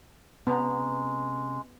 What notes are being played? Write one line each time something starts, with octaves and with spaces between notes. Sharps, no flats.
C3 G#3 B3 C#4 A#5